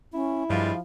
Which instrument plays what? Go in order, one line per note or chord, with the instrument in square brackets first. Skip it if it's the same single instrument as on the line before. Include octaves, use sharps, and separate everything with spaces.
[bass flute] C#4 [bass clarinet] E4
[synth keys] G2 [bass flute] F3 [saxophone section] G3 G#3 F4